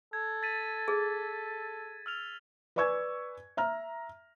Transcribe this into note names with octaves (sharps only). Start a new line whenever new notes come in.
A4 G#6
A6 B6 D#7
G#4
E6 F6 F7
B4 D5 G#5 C#6 E6 G#6
E5 A#5 F6